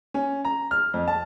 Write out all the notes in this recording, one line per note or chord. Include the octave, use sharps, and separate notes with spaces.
C#4
A#5
F6
F2
A5